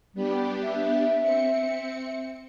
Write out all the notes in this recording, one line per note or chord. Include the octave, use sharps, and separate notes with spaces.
G3 B3 D4 G4
E5
C4 C#7